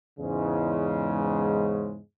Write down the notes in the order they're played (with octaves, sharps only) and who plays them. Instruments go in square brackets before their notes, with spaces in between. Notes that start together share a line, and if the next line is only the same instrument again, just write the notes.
[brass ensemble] E2 G#2 C#3 G#3